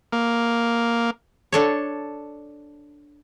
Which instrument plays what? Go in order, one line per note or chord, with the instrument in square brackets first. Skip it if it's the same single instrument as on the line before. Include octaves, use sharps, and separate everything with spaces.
[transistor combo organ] A#3
[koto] D4 A4 C#5